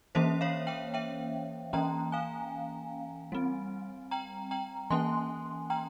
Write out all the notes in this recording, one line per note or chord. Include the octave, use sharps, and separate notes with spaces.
E3 A#3 C#4 C5 E5
C#5 F5
E5 G5
E5 G5
E3 A#3 C#4 G5 A#5
F5 G#5
G3 C4
G5 A#5
G5 A#5
E3 A#3 C#4 G#5 C6
G5 A#5